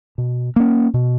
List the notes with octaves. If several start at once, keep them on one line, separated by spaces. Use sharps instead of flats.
B2
A#3 C#4
B2